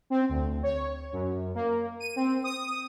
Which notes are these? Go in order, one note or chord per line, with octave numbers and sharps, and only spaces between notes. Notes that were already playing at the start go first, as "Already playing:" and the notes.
C4
D2
C#5
F#2
A#3
D#7
C4
D#6